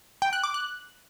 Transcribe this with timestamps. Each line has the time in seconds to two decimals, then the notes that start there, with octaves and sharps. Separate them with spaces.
0.22 G5
0.33 F#6
0.43 D6
0.54 F#6